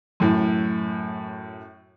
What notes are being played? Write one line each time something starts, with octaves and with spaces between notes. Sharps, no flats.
F#2 A2